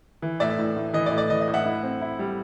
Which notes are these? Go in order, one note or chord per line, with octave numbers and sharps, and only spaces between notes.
E3
A2 D5 E5
A2
A2
E3 D#5
D5
A2
D5
E3 D#5
D#5
A2
E5 F#5
E4
C4
E4
G3